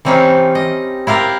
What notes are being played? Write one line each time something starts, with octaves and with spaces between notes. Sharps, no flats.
E3 G3 C4 C#4 D#4 F4
D#5
E4 F4 G4 A#4 F5